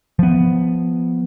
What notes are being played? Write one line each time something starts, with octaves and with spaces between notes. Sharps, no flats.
F3 B3